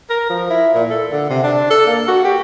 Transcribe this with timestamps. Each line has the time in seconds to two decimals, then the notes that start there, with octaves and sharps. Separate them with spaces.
0.10 A#4
0.29 F3
0.50 E4
0.74 A#2
0.90 A4
1.12 D3
1.30 C3
1.43 D4
1.70 A4
1.86 A#3
2.08 F#4
2.24 G4